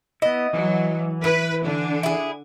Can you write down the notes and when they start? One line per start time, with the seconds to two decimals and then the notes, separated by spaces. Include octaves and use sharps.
0.22 B3 E4 D#5
0.53 E3 F#3
1.24 E4 B4
1.65 D3 D4
2.03 E4 G#4